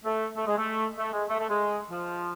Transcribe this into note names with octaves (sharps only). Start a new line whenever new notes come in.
A3
A3
G#3
A3
A3
G#3
A3
A3
G#3
F3